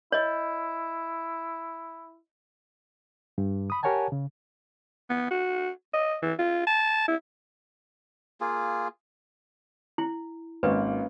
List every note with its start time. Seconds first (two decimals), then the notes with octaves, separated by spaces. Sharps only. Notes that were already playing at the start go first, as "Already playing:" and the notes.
0.12 E4 C#5 D#5
3.38 G2
3.70 B5 D#6
3.83 G4 A#4 C#5 F#5 G#5 A5
4.12 C#3
5.10 B3
5.31 F#4
5.94 D#5
6.22 E3
6.39 F4
6.67 A5
7.08 E4
8.41 A#3 F4 G#4
9.98 E4
10.63 G#1 A#3 C#4 B4 F5